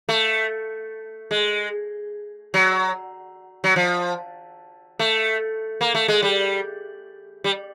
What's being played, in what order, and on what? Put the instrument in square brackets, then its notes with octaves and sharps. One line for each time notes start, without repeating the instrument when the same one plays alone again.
[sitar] A3
G#3
F#3
F#3
F3
A3
A#3
A3
G#3
G3
G3